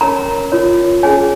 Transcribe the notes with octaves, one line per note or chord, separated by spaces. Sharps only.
C#4 A#4 C#5 A#5
F4 A#4 C#5
C#4 G#4 C#5 G#5